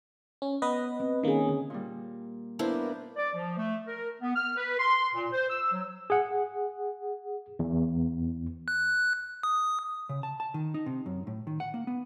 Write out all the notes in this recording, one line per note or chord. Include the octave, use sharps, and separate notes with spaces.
C#4
B3 B4 D#5
C4
D#3 A#3 C#4 G#4
D3
A#2 G3
A#3 B3 D4 E4 C5
D5
F3
A3
A#4
B3
F6
B4
C6
A#2
C5
E6
F#3
G#4 F#5
E2
F#6
D#6
C#3
A5
A5
D#3
D#4
C3
F#2
A2
D#3
F#5
A#3
B3